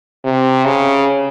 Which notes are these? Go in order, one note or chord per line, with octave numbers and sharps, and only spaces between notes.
C3
C#3